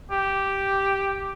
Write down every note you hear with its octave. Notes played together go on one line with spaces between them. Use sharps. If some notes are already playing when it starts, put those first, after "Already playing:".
G4